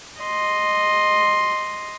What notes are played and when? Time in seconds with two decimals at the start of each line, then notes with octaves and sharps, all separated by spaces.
0.21 D#5 C6